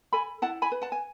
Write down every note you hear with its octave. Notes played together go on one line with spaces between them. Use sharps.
A4 G#5 B5
E4 F#5 A5
G#5 B5
B4
F#5 A5
G#5